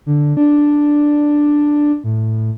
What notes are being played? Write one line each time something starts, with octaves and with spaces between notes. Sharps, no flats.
D3
D4
A2